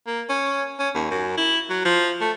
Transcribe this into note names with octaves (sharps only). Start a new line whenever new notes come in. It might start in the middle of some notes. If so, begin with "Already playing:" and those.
A#3
C#4
C#4
D#2
F#2
E4
F#3
F3
A3